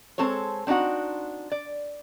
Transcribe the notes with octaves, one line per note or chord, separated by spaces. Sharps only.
G#3 C4 A4 C5 C#5
C4 D4 D#4 F#4 F#5
D5